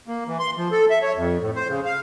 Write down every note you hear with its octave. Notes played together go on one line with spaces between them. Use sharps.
A#3
E3
C6
F3
A4
E5
C#5
F2
A2
C5
C#3
F5